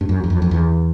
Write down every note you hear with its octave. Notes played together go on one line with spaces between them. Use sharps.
G2
F#2
E2
F2
F2
E2